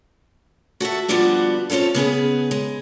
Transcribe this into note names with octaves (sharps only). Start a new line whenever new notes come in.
F#4 A4 C5 E5
D3 F3 G3 B3 D4 F#4
C4 C#4 D#4 F4 A4
C#3 B3 G#4 B4
G#3